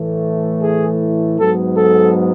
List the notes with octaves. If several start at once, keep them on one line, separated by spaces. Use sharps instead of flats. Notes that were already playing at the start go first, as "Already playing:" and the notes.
Already playing: A2 E3 A3
G#4
G#2 F#3 B3 A4
A4